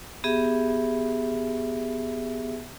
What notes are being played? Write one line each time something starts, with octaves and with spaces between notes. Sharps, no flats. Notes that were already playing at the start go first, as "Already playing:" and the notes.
B3 G4 G#4 E5